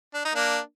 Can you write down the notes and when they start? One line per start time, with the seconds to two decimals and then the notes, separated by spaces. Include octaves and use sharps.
0.14 D4
0.25 D#4
0.34 A#3 D4